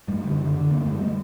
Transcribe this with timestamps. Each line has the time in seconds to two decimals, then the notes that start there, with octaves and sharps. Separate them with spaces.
0.08 F#2 G3 A3
0.24 D3
0.39 D3
0.55 D3
0.70 F#2 A#3
0.81 A3
0.86 F#2 G#3
0.99 G3 A3